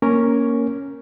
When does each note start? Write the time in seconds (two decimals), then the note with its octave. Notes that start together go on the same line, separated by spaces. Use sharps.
0.02 A#3 C#4 A#4 C#5